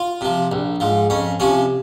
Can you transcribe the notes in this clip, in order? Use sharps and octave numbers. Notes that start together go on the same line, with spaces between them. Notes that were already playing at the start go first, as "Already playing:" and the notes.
Already playing: F4
C3 F3
A#1
G#2 F3
F2 C#4
C3 F3 C#4